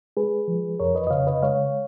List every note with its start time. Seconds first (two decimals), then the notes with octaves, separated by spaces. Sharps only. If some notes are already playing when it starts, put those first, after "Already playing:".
0.17 G#3 G#4 B4
0.48 F3
0.80 F2 A#4 C#5
0.95 B4 D#5
1.07 D#5
1.11 C#3 C#5 F5
1.27 B4 D#5
1.43 G#3 C#5 F5